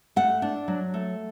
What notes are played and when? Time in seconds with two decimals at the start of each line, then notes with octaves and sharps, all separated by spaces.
0.16 A3 F#5
0.42 D4
0.68 F#3
0.94 A3